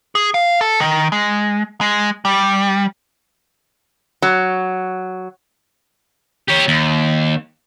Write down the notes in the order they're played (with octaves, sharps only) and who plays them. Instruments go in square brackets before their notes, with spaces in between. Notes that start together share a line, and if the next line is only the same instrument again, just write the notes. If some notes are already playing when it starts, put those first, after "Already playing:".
[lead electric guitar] G#4
F5
A4
D#3
G#3
G#3
G3
[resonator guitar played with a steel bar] F#3
[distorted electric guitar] G4 C#5
D#2